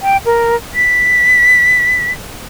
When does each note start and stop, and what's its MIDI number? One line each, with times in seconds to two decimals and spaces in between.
0.01 0.17 79
0.26 0.56 70
0.75 2.12 95